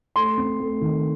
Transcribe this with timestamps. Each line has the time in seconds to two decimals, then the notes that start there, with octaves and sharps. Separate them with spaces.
0.16 A3 C6
0.38 C4
0.60 A3
0.81 D#3